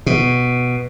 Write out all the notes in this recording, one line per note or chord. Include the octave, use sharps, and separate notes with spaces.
B2